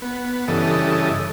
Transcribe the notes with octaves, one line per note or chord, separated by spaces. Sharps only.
B3
G2 C#3 E3 A4 D#5